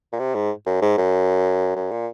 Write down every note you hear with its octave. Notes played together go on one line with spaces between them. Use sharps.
A#2
C3
G#2
F#2
G#2
F#2
F#2
A#2